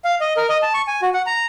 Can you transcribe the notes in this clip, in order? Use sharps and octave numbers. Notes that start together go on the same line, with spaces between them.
F5
D#5
A#4
D#5
A5
C#6
G#5
F#4
F#5
A#5